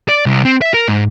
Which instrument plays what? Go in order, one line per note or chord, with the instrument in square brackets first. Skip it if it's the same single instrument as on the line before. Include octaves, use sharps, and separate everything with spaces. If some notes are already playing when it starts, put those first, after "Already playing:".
[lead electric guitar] D5
C2
C4
E5
A#4
G#2